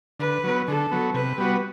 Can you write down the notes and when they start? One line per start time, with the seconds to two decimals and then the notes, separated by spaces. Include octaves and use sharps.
0.19 D3 B4
0.44 F#3 B3
0.68 D3 A4
0.91 F#3 B3
1.14 C3 B4
1.38 G3 B3 F#4